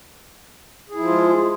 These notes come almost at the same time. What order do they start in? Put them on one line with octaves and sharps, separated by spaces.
G#4 E4 F3 F4 G#3